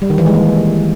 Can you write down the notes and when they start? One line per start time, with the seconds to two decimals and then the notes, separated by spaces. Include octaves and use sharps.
0.02 G3
0.10 D#3
0.18 E3
0.26 G#3
0.34 A#3